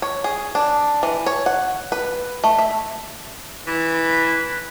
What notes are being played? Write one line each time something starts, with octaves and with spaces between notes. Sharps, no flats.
C#5
G#4
D4
E3
C#5
F#5
B4
A3
E5
E3 B4